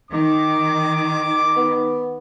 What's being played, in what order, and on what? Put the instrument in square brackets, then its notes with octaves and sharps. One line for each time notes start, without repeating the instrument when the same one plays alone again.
[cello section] D#3 [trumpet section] D6
[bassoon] B3